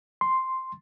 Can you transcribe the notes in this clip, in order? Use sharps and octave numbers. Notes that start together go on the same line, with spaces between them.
C6